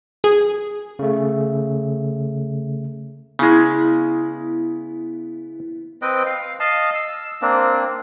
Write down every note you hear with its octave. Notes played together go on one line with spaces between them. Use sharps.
G#4
C#3 A3
C#3 G#3 B3 E4
C4 B4 D#5 G5
F5
D#5 F5 A5
E6
A#3 C4 D4